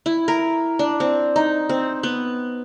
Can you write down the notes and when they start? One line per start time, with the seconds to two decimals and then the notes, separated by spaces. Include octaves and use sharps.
0.06 E4
0.28 A#4
0.79 D4
1.00 C4
1.36 D#4
1.69 C4
2.03 B3